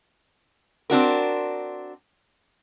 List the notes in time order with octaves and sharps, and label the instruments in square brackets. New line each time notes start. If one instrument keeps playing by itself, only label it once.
[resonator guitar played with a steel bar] C4 D4 F#4 A#4